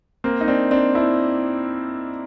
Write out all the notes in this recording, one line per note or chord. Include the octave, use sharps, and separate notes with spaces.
A#3 C4
D#4
C4 D4
C4 D4
D4 E4